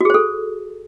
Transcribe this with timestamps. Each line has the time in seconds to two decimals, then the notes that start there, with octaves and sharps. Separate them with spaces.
0.01 F#4
0.05 G#4
0.10 C5
0.14 A4